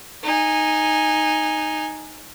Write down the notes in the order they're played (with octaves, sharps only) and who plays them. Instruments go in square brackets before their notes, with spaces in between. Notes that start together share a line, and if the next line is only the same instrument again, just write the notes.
[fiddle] D#4 G#5